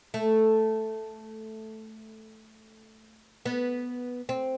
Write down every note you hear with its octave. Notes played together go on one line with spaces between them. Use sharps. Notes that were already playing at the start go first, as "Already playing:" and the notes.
A3
B3
C4